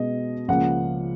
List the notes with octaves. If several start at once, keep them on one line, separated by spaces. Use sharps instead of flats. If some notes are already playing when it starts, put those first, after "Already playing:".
Already playing: B2 G#3 B3 D#5
C#2 C#3 F3 A#3 F#5